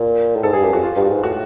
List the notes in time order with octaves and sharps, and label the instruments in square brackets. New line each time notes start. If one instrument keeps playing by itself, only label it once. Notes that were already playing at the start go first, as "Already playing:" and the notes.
Already playing: [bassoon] A#2
A2
[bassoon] G#2 [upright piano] A4
[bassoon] G2 [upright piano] G#4
[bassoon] F#2 [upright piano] G4
[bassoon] F2 [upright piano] F#4
[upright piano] F4
[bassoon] G2
[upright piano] F#4
[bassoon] G#2
[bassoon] A2 [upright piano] F#4